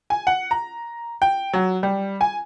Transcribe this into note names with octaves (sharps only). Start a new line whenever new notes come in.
G#5
F#5
A#5
G5
F#3
G3
G#5